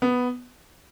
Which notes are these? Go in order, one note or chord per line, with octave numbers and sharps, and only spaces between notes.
B3